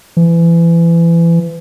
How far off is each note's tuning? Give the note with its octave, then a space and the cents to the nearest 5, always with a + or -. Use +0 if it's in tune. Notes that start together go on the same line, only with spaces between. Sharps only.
E3 +30